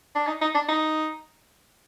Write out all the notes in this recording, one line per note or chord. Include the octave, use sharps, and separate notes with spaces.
D4
D#4
D#4
D4
D#4